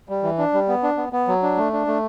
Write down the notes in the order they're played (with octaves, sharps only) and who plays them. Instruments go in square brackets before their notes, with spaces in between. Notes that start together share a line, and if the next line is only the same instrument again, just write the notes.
[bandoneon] G3
E3
D4
G3
B3
D4
B3
B3
F#3
D4
A3
D4
A3